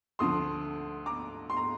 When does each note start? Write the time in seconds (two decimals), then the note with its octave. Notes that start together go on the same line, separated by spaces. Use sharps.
0.19 D2 D3 F3 C6 D#6
1.06 A#5 D6
1.50 C6
1.57 A#5